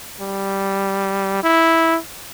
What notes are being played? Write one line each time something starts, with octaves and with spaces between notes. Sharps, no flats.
G3
E4